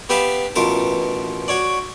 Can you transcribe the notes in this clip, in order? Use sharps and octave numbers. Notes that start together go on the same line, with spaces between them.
B3 G4 B4 E5 F5 A5
A1 B2 F4 A#4 A5
F#4 C#5 D5